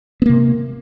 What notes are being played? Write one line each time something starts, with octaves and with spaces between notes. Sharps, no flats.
C3 A#3 B3